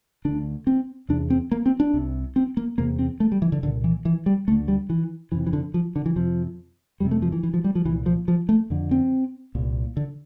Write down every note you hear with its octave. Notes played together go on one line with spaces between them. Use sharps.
D2 D3 D4
C4
E2 C3 D4
C4
A#3
C4
D4
C2 C3
C4
A#3
E2 C3 A#3
C4
A3
G3
E3
D3
C2 A#2 D3
E3
E3
G3
D2 D3 A3
G3
E3
F2 C3 E3
E3
D3
F3
D3
E3
F2 C3 F3
F2 C3 G3
A3
F3
E3
E3
F3
G3
F3
C2 A#2 E3
F3
F3
A3
F2 D3
C4
C2 A#2
D3